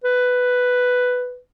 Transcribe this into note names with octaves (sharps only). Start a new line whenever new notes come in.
B4